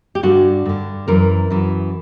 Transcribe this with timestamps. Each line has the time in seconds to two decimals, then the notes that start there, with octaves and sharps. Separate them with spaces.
0.15 G4
0.23 G2 D3 F#4
0.66 G2 D3
1.08 F#2 E3 A#4
1.50 F#2 E3